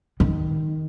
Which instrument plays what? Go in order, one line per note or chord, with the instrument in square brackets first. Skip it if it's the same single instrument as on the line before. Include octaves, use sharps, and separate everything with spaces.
[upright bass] D#3